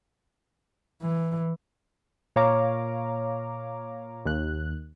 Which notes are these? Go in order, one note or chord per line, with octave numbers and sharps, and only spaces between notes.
E3
A#2 C#5 F5 A#5 D6
D#2 F#6